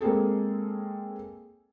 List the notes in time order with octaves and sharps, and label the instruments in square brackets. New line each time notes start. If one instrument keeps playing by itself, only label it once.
[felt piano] G#3 A#3 C4 G#4 A4